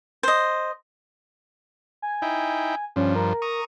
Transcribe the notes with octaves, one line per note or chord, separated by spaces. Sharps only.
C5 D#5
G#5
D#4 E4 G5
G2 F3 C#4
A#4
A#5 C#6 D#6